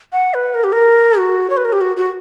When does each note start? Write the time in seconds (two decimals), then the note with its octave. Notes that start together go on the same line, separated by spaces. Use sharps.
0.13 F#5
0.34 B4
0.55 A#4
0.64 G4
0.73 A#4
1.18 F#4
1.50 C#5
1.57 B4
1.65 A#4
1.73 G4
1.81 F#4
1.97 F#4